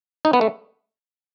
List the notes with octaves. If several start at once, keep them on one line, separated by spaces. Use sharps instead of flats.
D#4
B3
A3